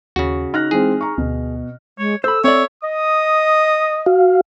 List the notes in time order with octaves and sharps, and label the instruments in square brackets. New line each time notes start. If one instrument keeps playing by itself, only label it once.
[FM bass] D#2 [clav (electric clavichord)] C#3 F#4
[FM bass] D#4 [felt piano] F6 F#6 A#6
[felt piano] E3 G#3 C4 [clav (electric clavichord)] G#4
[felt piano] A#5 C#6
[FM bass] D2 [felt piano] B2
[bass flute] G#3 [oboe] C#5
[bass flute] A4 [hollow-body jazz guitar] C5 B5 [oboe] E6
[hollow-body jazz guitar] C4 D5 [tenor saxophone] C#5 [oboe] E5
[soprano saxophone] D#5 [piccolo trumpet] D#6
[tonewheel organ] F#4 F5